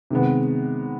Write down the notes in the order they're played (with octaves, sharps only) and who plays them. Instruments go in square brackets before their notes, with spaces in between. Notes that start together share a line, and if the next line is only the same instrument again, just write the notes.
[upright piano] C3 D#3 G#3 B3